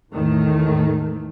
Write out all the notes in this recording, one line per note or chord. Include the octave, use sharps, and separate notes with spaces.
E2 A2 D#3 A3